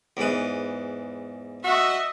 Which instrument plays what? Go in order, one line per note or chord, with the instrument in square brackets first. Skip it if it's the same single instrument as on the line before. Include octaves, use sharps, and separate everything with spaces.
[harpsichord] E2 G#2 B4
[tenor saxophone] F#4 [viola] D#5 E5